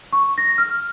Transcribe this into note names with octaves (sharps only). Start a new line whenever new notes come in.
C#6
A#6
F6